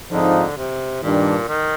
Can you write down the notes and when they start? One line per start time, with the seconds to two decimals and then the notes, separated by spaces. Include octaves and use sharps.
0.11 G#2 D3 F3 C4 D#4
0.57 C3
1.03 G2 A#2 D#3 G3 D4
1.48 D#3